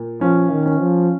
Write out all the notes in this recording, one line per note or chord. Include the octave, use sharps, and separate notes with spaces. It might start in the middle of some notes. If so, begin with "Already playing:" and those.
Already playing: A#2
F3 C#4
D#3
C#4
F3